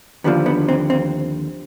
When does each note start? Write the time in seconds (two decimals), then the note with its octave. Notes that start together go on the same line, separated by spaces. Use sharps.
0.24 D#2 D3 F3 B3
0.46 B3
0.68 C4
0.90 C4